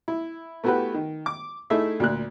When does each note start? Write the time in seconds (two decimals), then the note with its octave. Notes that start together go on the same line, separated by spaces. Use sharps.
0.08 E4
0.64 A3 B3 E4 F#4 G4 B4
0.94 D#3
1.26 D6
1.70 A3 D#4 E4 G#4 E5
2.00 D2 A#2 F#6